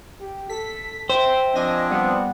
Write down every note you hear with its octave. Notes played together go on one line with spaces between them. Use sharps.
G4
A4 B6
C5 E5 G5
F3 C4 D4 D#5 G#5 A#6
G3 B3 F#5